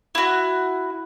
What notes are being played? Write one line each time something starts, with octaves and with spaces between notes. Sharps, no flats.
E4 F#4